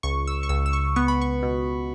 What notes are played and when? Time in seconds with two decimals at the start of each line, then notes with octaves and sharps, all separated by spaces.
0.03 C#2 C#6
0.27 E6
0.43 C#6
0.49 C#2 E6
0.66 E6
0.73 C#6
0.96 B3 C#6
1.08 B5
1.22 C#6
1.43 B2